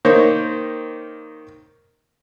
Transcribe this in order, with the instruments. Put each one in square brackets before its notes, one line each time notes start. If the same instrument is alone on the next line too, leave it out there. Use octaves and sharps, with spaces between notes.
[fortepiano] D#3 A#3 C5 C#5